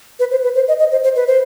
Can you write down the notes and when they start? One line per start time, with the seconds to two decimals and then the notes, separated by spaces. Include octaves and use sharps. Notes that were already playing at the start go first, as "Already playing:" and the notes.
0.20 B4
0.31 C5
0.44 B4
0.55 C5
0.68 D#5
0.79 D#5
0.91 C5
1.04 C5
1.16 B4
1.27 C5